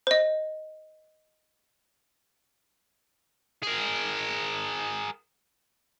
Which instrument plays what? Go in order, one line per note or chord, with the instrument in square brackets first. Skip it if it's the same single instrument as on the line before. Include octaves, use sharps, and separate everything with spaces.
[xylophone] C5 D#5
[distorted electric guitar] G#4 A#4